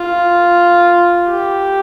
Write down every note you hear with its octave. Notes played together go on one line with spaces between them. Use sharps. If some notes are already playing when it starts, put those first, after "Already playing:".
Already playing: F4
G4